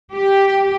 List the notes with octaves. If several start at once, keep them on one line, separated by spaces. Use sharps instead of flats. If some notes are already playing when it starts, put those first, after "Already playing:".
G4